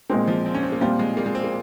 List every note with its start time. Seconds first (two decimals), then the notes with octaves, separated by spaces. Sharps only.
0.10 A#2 G#3 A#3 C4
0.27 F3
0.46 C4
0.55 C#4
0.63 C4
0.72 A#3
0.81 A#2 F3 G3 C4 F4
0.99 G#3
1.17 A#3
1.26 G#3
1.35 C4
1.44 A#3